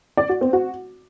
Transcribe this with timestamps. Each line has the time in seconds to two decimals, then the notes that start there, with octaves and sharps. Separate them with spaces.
0.17 D5
0.29 F#4
0.41 C4
0.53 F#4